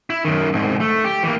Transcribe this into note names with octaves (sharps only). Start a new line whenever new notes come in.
E4
F#2 D#3
C2 G#2
A3
G4
E3 A#3